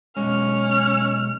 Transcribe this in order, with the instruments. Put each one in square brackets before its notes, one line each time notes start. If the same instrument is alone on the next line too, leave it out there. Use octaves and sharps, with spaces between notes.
[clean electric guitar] B1 G#2 G#3 [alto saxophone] C#4 [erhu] F6